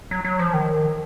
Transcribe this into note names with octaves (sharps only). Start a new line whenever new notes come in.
F#3
F#3
F3
D#3